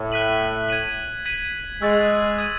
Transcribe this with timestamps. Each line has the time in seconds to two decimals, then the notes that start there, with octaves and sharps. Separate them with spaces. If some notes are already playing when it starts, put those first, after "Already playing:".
Already playing: A2
0.12 F#6 B6 D#7 F#7
0.69 G#6 D#7 F#7
1.26 G#6 B6 D#7 F#7
1.82 G#3 C#6 E6 A6
2.38 D#6 G#6 D#7 F#7